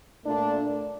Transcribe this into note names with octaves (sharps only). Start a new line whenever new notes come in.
A#2 A3 D4